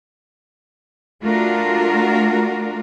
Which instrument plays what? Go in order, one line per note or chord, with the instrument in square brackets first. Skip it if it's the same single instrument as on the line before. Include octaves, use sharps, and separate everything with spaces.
[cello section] A3 D4 F4 F#4 A#4